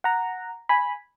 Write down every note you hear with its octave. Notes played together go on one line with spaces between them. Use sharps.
F#5 A#5
G#5 B5